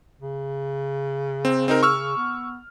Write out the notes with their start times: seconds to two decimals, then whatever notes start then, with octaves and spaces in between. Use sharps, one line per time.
0.20 C#3
1.45 C4
1.68 C4 D#4 A#4
1.83 C#6 E6 F6
2.17 B3